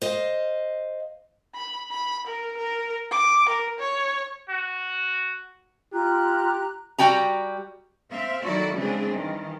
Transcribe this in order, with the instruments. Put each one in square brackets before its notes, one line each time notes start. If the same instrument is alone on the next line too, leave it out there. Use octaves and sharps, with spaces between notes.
[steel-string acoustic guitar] C5 D#5 F5
[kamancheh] B5
B5
A#4
A#4
D6
A#4
C#5
[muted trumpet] F#4
[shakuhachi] F4 [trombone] G4 [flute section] A#5 F#6
[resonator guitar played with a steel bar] G3 F#4 G5 A#5
[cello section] C4 E5 F5
D#3 F#3 E4 F#4 A4 D5
C#3 E3 G#3 C4 D4 G#4
G2 D#3 E3